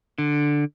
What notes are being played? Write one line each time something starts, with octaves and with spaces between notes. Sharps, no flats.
D3